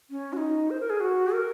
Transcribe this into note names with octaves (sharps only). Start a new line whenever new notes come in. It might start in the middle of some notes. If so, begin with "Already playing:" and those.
C#4
F#4
D#4
C5
A#4
G#4
F#4
A#4